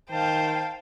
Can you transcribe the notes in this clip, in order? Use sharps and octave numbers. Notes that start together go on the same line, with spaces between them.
D#3 C5 F5 G5 A5